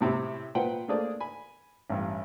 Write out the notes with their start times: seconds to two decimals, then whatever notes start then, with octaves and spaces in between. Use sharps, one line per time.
0.01 A2 C3 C4 E4 G4
0.55 A#2 B4 C5 F#5 G5
0.88 A3 A#3 D4 G#4 C5 D5
1.20 G#5 B5
1.90 A1 G2